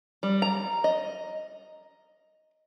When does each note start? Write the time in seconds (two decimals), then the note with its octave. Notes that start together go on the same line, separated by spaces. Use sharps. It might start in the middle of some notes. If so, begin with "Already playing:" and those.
0.23 G3
0.42 A#5
0.84 D#5